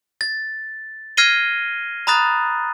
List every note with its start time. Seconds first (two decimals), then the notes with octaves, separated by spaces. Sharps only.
0.21 A6
1.17 F6 G#6 A#6 C7 D#7 G7
2.07 A#5 B5 D#6 F#6 A6